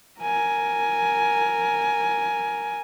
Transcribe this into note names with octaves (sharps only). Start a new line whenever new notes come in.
A#4 G#5